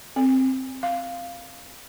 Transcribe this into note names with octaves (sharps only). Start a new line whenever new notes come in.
C4
F5